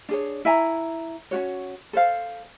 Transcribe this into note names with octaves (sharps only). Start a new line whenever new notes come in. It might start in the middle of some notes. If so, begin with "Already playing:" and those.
D4 G#4 C#5
E4 E5 G#5 A#5
C#4 D4 F#4 C#5
A4 C5 F5